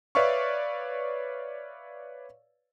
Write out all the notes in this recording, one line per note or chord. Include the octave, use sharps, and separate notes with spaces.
B4 C#5 D5 E5 F5 C#6